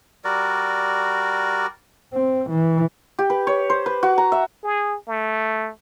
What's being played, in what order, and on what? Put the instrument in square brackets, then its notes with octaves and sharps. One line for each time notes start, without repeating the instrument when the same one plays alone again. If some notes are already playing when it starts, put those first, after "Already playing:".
[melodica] G3 F#4 A#4 D5
[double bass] C4
E3
[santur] G4
B4
C#5
C5
B4
F#4
A#5
E5
[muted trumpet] G#4
A3